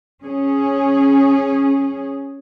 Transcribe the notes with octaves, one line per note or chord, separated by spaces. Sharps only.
C#4 G#4